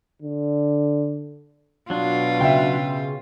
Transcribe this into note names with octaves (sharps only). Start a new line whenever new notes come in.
D3
B2 F#3 D4 F4
C#3 E5 G5